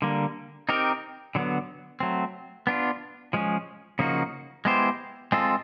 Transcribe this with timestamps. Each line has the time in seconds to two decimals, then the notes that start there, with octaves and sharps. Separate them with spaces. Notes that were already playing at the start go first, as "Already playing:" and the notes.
0.02 D3 G3 A#3
0.69 C4 D#4 G4 A#4
1.35 D3 F#3 B3
2.00 F#3 A3 C4
2.67 B3 D4 F4
3.33 F3 G#3 C#4
3.99 C#3 F3 A#3 D#4 F#4
4.65 G#3 B3 E4 G4 C5
5.32 G#3 C4 F4 A4